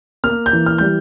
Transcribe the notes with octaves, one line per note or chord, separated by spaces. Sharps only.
A#3 F6
G6
E3
F6
G3 G6